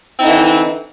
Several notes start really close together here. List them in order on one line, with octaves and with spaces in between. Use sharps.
C4 E4 D#4 D3 E3